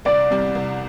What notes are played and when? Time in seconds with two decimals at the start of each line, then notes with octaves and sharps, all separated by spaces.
0.05 C2 D5
0.30 C3 G3
0.55 C2